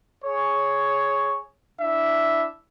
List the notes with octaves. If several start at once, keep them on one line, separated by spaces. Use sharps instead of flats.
G#4 C#5
D4 E4 E5